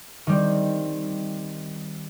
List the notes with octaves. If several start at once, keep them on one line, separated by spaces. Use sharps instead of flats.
D#3 G3 C4